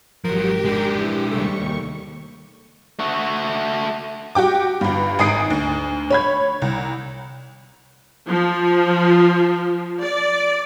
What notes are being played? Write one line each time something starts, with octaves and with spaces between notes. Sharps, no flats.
G#1 F3 F#3 G4 A#4
G#3 D4
E3
D#2 C3 G3 A3 C#6
A3 F#4
F#4 G4 G5 D6
G1 G2
G#1 G#5 D#6 C7 D7
D2
C#5 B5 G#6
C2
F3
D5